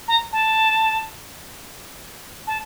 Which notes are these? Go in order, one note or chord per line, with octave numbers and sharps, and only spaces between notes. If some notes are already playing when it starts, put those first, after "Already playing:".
A#5
A5
A5